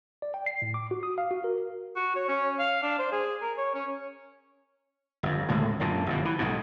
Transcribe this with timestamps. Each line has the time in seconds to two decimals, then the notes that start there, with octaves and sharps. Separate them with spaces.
0.22 D5
0.34 G5
0.46 C7
0.62 A2
0.74 D6
0.91 F#4
1.03 D#6
1.18 F5
1.31 F#4
1.44 A#4
1.96 F#4
2.16 C#5
2.28 C#4
2.59 F5
2.83 D4
2.98 C5
3.12 G#4
3.42 A#4
3.58 C#5
3.74 C#4
5.23 G1 F2
5.49 D2 A2 C#3 G#3
5.80 F#2 A#2 D3
6.06 G1 F2 B2
6.25 E3
6.39 B1 G#2 B2